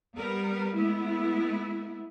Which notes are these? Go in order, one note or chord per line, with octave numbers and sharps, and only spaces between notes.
G3 B3 A#4 B4
G#3 A3 B3 E4